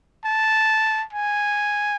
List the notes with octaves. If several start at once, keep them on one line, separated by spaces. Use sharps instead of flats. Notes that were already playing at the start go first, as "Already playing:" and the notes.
A5
G#5